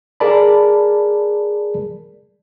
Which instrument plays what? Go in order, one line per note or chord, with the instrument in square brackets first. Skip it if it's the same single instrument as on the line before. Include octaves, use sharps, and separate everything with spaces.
[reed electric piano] G#4 A#4 D5 A5 B5